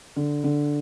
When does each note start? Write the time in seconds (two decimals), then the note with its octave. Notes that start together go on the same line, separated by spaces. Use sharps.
0.16 D3
0.44 D3